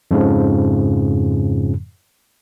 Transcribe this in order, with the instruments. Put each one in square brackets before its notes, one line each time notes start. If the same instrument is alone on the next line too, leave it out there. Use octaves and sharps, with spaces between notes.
[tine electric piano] F2 G#2 C#3 F3